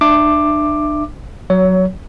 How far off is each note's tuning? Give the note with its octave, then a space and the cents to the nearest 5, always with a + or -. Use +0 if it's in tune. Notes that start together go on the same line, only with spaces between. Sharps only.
D4 +35 E5 +15 D6 +10
F#3 +0 C#5 +25